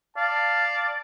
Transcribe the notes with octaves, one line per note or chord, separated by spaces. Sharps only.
D5 F5 A5